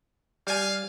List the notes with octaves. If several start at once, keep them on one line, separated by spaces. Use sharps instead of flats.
G3 F5 G#5